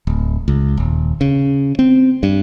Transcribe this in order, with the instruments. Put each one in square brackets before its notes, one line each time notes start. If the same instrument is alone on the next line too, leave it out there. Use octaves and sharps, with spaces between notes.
[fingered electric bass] D1
C#2
D#1
C#3
C4
G2